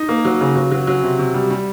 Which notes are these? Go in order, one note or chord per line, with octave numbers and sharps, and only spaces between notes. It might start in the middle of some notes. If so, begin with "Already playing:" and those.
Already playing: D#4
A#3
F#3
C#3
F#3
F#3
F#3
C3
C3
G3
G3